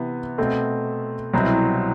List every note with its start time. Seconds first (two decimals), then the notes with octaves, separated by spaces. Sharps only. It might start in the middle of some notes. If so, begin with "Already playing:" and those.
Already playing: C3 E3 B3
0.38 B2 A3 C4
1.33 C2 B2 F#3 C4 E4